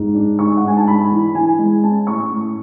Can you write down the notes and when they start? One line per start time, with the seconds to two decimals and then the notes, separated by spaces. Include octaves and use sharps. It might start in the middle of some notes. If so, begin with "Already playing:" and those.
Already playing: G#2
0.15 D4
0.39 G#2 C#6
0.57 F#5
0.63 G#2 G#5
0.77 A5
0.87 D4 B5
1.11 E3
1.35 E3 G#5
1.59 G#3
1.84 C#4 A5
2.07 A2 C#6
2.32 A2